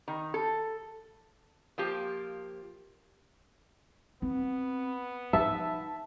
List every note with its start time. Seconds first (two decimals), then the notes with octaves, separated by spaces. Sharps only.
0.08 D#3
0.34 A4
1.78 F3 A#3 F4 G4
4.22 B3 C4
5.33 F3 D#4 E5 A5